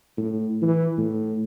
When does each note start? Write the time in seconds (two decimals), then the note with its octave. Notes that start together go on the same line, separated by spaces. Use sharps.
0.17 A2
0.62 E3
0.97 A2